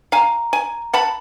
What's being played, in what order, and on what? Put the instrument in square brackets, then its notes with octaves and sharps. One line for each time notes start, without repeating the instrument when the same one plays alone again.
[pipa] F5 G#5 [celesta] A#5
[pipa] G#5
F#5 A5 B5